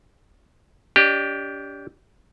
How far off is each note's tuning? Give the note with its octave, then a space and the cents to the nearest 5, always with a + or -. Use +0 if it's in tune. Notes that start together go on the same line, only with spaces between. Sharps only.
D4 -40 G4 +0 D#5 -45